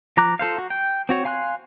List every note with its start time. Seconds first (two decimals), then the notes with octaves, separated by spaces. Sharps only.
0.17 F3 A#5 D6 F#6
0.39 F4 A4 C5 F5
0.58 F#4
0.70 G5
1.09 C4 F#4 C#5
1.25 F5 G#5 C6 F#6